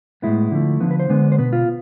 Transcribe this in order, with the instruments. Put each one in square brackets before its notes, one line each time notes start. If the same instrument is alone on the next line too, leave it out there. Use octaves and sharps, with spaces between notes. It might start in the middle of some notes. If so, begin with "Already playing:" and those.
[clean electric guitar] A2 G#3 B3 E4
D3 F3 A3
D3 F3 B3
B4
C5
D3 G#3 B3
C5
B2 B3 B4
F4